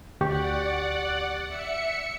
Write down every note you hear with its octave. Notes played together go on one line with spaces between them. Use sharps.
D2 G4 D5 F#5 C#6
E5 C#7